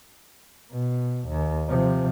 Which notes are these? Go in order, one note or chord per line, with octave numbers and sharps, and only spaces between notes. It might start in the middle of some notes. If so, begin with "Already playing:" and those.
B2
D#2
C3 F3